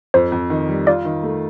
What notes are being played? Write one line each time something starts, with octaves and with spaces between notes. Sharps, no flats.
F2 C5
F2
D#3
G3
F4 D5
D#3
A3